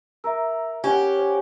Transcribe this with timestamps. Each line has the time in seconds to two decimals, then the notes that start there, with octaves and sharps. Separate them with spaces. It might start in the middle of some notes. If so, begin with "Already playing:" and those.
0.24 A#4 E5 A#5 E6
0.84 C#4 G4 F#5 G#6
1.18 C5